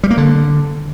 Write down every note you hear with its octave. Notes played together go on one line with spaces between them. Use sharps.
G3
A#3
D3